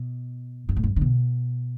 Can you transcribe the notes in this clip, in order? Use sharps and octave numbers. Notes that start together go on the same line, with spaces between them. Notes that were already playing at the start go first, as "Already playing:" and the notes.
Already playing: B2
G2
A2
G2
D3
B2